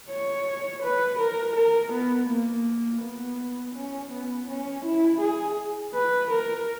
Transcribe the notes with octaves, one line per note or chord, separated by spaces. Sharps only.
C#5
B4
A#4
A#4
B3
A#3
B3
C#4
B3
C#4
E4
G#4
B4
A#4